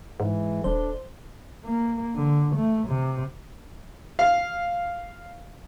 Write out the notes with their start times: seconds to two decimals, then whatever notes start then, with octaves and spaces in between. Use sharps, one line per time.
0.20 G#2 E3 G#3
0.64 D#1 D4 A4 C5
1.64 A#3
2.15 D3
2.56 A3
2.88 C3
4.19 F5